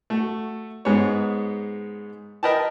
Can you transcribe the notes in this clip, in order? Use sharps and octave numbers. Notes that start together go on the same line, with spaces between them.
A3 F#4
G#2 G#3 B3 C#5
A#4 B4 D#5 G5 A5